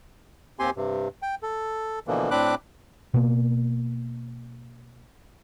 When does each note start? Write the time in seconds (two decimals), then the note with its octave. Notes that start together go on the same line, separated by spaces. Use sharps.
0.59 D#2 C4 G4 G#5 C6
0.76 G2 C3
1.22 G5
1.43 A4
2.07 B2 D3 E3 F3 A#3
2.31 A2 C4 D4 B5 D6 F#6
3.14 B2 A#3